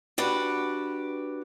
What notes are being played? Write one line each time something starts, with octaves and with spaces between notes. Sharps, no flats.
D4 F#4 G4 B4